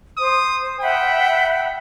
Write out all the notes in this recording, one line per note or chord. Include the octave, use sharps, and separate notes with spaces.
C5 D#6
E5 F#5 G5 B5